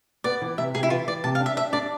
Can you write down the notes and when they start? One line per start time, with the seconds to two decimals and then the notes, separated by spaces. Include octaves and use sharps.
0.24 B3 D5
0.42 E3
0.58 C3 E5
0.75 C3 G#4
0.83 E4
0.90 E3 F4
1.07 E3 D5
1.24 C3 A5
1.35 F5
1.40 D4
1.46 E5
1.57 D4 E5
1.73 D4 D5